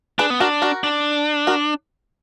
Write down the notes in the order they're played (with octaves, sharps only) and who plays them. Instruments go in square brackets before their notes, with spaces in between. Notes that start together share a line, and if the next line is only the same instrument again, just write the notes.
[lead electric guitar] D4 [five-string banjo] G#4 B4
[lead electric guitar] B3
[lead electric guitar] D4 [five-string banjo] F#4 A#4
[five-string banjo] F#4 A#4
[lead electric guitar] D4
[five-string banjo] F#4 A#4